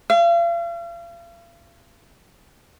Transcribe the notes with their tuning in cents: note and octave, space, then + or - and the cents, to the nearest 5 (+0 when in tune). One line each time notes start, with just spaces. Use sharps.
F5 -40